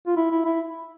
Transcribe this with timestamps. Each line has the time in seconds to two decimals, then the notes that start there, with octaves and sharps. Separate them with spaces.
0.07 F4
0.16 E4
0.31 E4
0.45 E4